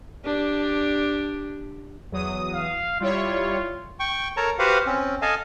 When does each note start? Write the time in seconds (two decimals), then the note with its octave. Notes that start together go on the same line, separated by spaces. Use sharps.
0.25 D4 G4
2.11 E2 F#3 D#6
2.54 F5
3.01 G3 E4 F4 C#5
4.00 G5 C#6
4.37 A4 A#4 C#5 A5 A#5
4.59 F#4 G4 B4 C5 F5 F#5
4.87 C4 C#4
5.22 A4 D#5 F5 G#5 A5